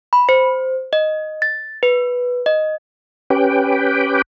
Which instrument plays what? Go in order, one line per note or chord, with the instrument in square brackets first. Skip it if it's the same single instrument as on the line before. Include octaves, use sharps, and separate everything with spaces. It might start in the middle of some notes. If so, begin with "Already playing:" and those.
[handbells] B5
C5
D#5
A6
B4
D#5
[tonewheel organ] C#4 G4 B4 G5